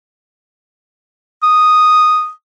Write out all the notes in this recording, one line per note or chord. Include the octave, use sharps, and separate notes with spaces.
D#6